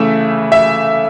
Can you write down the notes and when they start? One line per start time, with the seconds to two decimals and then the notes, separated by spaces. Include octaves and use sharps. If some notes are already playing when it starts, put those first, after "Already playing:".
Already playing: C#3 E3 A3 E5
0.52 E5